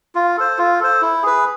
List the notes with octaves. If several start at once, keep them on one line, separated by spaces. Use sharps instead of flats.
F4
A4 C5
F4
A4 C5
E4
G#4 B4